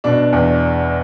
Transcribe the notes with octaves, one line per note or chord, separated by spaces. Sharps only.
B2 D4
E2